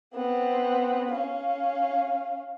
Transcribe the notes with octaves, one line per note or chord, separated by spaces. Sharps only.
B3 C4
C#4 F5